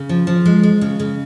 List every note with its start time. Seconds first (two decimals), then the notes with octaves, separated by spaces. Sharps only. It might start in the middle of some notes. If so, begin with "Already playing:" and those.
Already playing: C#3
0.09 F3
0.27 F3
0.45 G#3
0.63 G#3
0.81 C#3
1.00 C#3